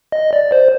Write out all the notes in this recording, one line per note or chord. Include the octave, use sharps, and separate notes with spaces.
D#5
D5
C5